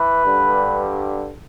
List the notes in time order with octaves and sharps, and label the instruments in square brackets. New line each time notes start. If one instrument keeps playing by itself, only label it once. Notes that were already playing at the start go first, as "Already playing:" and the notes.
Already playing: [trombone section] E3 B4
G2 D3 G3